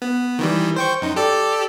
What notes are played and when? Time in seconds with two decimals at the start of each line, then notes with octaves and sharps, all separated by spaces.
0.02 B3
0.39 D#3 E3 G3
0.76 C5 G5 C#6
1.02 F#2 D#4
1.16 G4 A4 D5